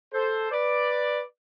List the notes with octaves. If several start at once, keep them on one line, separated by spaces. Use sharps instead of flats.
A4 C5
B4 D5